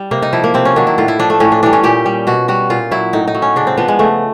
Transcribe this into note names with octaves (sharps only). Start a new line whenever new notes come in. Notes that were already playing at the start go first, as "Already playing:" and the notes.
Already playing: G3
C3 A#3
D#4
F3 E4
A#3
C3 C4
C#4
D#3 F#3 D4
E4
A2 F4
E4
F3 D4
A3
A2 C#4
D4
E3 G3 D4
C#4
A#2 G4
G3
B2 F#4
G3 F#4
A#2 F4
F#3 E4
A2 D#4
D#4
F#3
C#4
C#3 D4
C4
F3 B3
G#3
C#3 A3